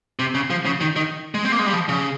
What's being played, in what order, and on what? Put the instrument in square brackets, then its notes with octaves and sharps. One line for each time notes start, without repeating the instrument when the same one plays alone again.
[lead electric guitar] C3
C#3
F3
C#3
D#3
D#3
G#3
C4
A#3
G#3
G3
F3
C#3